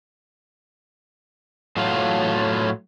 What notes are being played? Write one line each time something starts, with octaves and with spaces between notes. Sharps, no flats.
A2 F#3 F4